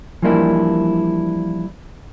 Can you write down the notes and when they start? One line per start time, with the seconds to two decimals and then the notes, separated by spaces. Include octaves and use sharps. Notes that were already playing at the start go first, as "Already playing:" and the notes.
0.22 E3 F3 G3 A#3 D4 E4